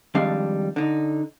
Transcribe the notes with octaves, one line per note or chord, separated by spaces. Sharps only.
F2 D#3 G3 G#3 D4 F5
D3 D#4